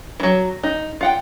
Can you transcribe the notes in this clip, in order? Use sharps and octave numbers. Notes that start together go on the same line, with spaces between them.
E3 F#3
D#4
F4 F#5 G5